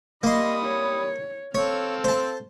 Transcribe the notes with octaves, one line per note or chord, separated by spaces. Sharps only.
G3 A#3 D#5 B5 C6 D#6
C#5
C4 A4 C#5 F5
C5 A5